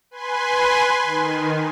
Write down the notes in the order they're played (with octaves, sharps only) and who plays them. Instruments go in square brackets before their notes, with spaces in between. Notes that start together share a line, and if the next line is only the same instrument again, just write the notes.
[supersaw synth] B4 G#5 C6
D#3